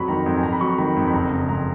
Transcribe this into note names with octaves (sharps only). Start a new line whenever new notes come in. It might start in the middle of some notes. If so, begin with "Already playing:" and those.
Already playing: F2 F#3 B5 C#6
D#3 A#5
F2
G#5
F2 A#5
B5
F#3 C#6
A#5
D#3 B5
F2
B5
F#1 A#5
C#3
F2 A#5